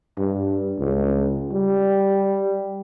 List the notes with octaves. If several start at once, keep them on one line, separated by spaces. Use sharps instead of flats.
G2
C#2
G3